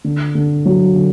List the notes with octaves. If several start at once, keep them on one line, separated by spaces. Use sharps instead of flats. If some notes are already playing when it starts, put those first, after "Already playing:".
D3
D3
F#3
D3